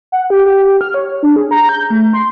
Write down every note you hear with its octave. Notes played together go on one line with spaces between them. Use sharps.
F#5
G4
G4
F6
C#5
D4
G#4
A#5
G6
A3
C6